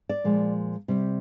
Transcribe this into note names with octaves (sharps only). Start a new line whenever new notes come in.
D5
A#2 F3 G#3
C3 G3